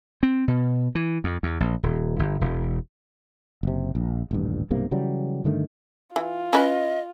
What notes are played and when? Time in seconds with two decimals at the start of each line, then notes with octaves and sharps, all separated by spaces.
0.23 C4
0.48 B2
0.95 E3
1.24 F2
1.43 E2
1.60 A#1
1.83 D#1
2.19 G1
2.41 E1
3.63 F#1 C3
3.95 A#1
4.31 D#1 A1 G2
4.70 B1 G2 C3 A#3
4.91 C#3 E3 F#3 G3
5.44 G2 D3 D#3 A3
6.16 E3 F4
6.53 C#4 E4 B4 D#5